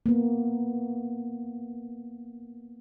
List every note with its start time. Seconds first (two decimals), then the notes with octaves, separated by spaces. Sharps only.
0.06 A#3 B3